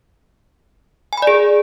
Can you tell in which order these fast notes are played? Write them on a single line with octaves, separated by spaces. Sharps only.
G#5 B5 D5 G#4